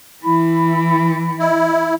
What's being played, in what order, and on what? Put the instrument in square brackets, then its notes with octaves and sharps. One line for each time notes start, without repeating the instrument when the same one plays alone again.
[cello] E3 [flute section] E4 B5
[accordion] E4 [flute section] D#5